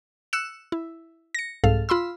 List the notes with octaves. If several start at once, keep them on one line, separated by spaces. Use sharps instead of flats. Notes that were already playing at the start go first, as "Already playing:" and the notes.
E6 F#6 C#7 E7
E4
A#6 C#7
C2 G#2 A4 F5
F4 B5 C6 E6